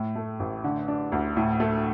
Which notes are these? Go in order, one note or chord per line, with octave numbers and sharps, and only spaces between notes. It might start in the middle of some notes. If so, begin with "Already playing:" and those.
Already playing: A2
A3
A1
D3
D4
D2
A2
A3